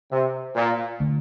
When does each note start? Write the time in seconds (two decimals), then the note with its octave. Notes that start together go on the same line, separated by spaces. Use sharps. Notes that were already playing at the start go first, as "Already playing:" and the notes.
0.10 C3
0.55 A#2
1.00 D3 A3